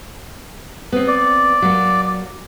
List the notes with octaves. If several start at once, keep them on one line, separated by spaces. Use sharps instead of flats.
B3 C4
D5
F#3 A#3